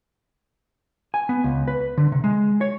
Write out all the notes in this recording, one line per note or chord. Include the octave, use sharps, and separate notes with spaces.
G#5
B3
C#2
B4
D3
C3
G#3
C#5